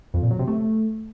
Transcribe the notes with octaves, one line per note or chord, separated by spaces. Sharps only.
F2
A#2
F#3
C3
A3